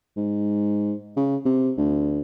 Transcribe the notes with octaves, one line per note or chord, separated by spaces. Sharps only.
G#2
C#3
C3
D2